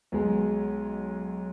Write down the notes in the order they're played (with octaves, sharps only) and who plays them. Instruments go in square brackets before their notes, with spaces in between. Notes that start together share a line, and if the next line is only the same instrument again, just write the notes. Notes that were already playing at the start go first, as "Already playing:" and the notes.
[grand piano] B1 G#3